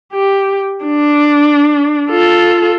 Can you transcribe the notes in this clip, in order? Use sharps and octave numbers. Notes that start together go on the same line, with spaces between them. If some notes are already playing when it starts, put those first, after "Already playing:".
G4
D4
F4 A4